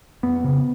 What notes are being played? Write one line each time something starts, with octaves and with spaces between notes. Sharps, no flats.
F2 B3
C#3